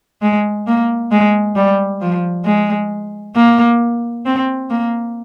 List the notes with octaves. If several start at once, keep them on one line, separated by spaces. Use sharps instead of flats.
G#3
A#3
G#3
G3
F3
G#3
A#3
C4
A#3